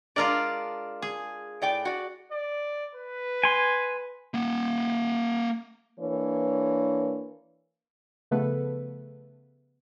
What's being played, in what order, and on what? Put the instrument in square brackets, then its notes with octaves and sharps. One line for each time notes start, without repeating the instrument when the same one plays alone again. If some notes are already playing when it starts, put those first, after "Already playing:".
[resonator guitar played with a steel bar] G#3 D4 [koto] F4 A#4 D5
[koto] G#4
[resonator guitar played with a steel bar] A2 D5 G5
F#4 D5
[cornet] D5
B4
[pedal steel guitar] G#5 C6
[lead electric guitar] A#3 F#5
[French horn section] E3 A#3 D4 C#5
[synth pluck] C#3 F3 A3 B3 A4 B4